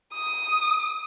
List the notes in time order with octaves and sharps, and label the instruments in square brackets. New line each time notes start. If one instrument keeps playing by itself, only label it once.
[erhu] D#6